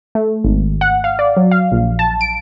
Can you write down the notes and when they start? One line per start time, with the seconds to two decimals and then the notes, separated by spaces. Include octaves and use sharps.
0.15 A3
0.44 G#1
0.81 F#5
1.04 F5
1.19 D5
1.37 F#3
1.51 F5
1.72 A#1
1.99 A5
2.21 D7